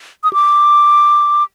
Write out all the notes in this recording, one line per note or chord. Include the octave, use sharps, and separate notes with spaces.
D#6
D6